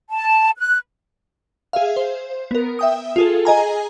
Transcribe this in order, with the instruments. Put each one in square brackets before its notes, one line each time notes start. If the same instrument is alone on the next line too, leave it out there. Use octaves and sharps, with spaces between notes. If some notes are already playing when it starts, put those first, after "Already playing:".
[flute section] A5
F#6
[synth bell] G#4 E5 F5
C5
B3 A#4
E5 G5 D#6
F4 G#4 A4
G#4 D#5 G#5 A#5